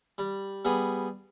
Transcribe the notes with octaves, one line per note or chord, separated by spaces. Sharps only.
G3
G3 B3 G#4